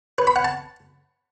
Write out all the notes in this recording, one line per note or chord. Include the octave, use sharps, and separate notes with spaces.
B4
B5
F#5
A5